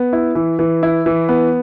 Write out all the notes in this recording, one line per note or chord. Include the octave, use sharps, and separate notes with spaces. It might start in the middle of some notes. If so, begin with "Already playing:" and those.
Already playing: B3
E4
E3
E3
E4
E3
B3